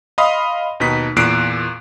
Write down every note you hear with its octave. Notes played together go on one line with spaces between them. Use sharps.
D#5 F5 B5 C6 D#6
D#2 B2 D#4 B4 B6
E2 A#2 F#6 C7 D7